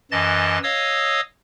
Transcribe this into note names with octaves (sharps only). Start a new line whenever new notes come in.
F#2 E3 D#5 A5 A6
C#5 D#5 F5 D#6 E6